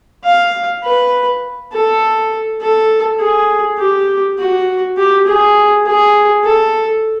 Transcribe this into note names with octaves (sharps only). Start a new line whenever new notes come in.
F5
B4
A4
A4
G#4
G4
F#4
G4
G#4
G#4
A4